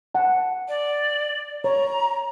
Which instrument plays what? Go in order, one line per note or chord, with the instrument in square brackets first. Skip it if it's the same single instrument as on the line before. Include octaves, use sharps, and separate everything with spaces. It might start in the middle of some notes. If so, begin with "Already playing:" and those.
[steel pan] F#5 A5
[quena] D5
[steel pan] C#5 [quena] A#5